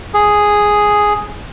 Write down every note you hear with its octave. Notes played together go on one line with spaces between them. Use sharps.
G#4